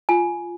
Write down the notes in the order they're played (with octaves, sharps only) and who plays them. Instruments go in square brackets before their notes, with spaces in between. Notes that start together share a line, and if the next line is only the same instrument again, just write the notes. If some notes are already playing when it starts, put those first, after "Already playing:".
[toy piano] F4 G#5